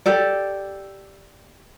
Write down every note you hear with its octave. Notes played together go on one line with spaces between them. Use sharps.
G4 A4 D5